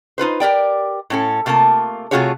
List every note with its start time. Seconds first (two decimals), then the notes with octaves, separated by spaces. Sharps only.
0.18 D#4 F4 B4 C5
0.40 G4 A#4 D5 G5
1.10 A2 C#4 A4
1.46 C3 A3 A#3 F4 A5
2.11 C3 A3 F4 F#4 G#4 C#5